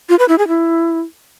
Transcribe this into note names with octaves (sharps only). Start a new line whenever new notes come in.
F4
B4
E4
G#4
E4